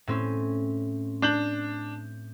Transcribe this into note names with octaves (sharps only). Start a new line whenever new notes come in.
A2 C4 C#4
D4 G6 F#7